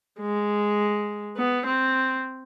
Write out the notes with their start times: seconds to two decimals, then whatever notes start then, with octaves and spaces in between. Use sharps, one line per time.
0.20 G#3
1.37 B3
1.66 C4